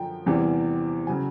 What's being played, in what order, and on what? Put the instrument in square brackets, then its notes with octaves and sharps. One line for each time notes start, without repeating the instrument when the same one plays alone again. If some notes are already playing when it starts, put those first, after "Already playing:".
Already playing: [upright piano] F#2 D3 F3 G5
E2 C3 E3 G3
C#3 F#3 G#5